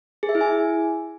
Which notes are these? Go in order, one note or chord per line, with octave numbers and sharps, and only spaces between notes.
G#4
E5
E4
G#5